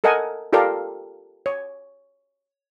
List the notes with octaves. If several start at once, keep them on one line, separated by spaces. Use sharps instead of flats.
A4 A#4 D#5 F#5 G#5
F4 G4 A4 A#4 D5 F5
C#5